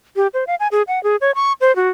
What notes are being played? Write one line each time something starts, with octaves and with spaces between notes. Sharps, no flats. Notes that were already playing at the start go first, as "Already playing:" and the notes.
G4
C5
F5
G#5
G#4
F#5
G#4
C#5
C#6
C5
F#4